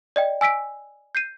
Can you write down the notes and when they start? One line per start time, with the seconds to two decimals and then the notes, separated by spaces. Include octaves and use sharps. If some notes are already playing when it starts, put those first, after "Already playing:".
0.16 D5 D#5 G5
0.41 G#5 E6 B6 D7
1.15 G6 C7 D#7